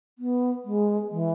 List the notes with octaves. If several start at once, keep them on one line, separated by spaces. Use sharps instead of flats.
B3
G#3
E3